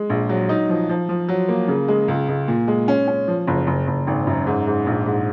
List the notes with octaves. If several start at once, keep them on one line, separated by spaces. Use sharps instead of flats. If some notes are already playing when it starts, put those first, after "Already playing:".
Already playing: G#3
A#1
F#3
D#4
F3
F3
F3
F#3
A#3
C#3
G#3
C#2
C#2
A#2
G#3
C#4
C#4
F3
F#1
F#1
F#1
G#1
F#2
G#2
G#2
A#1
G#2